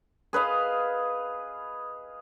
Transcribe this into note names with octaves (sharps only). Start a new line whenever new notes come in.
G#4 B4 D#5 F5